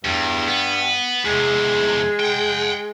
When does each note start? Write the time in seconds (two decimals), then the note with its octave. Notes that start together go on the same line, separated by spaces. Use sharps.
0.05 E2 G2
0.48 B3
1.25 E2 C3 G#3
2.20 F#5 G5